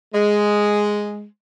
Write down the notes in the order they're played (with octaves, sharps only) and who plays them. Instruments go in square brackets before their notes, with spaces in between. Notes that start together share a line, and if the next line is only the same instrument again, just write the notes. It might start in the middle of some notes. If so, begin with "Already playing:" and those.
[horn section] G#3